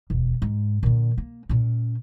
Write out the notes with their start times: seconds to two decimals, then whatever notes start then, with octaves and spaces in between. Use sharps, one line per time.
0.10 E1 D2
0.42 G#2
0.83 A#2 D3
1.18 A#3
1.49 A#2 C#4